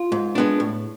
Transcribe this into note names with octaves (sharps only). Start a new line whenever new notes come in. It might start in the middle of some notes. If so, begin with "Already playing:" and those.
Already playing: F4
G#2
G#3 B3 D4
A2